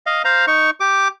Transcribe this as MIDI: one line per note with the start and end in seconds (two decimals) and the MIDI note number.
0.06 0.22 75
0.06 0.22 77
0.25 0.45 72
0.25 0.45 77
0.25 0.45 82
0.47 0.70 63
0.47 0.70 85
0.80 1.08 67
0.80 1.08 86